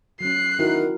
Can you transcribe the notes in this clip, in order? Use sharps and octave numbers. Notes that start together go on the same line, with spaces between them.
F#3 C#4 F#6 C7
D#3 E4 F#4 A#4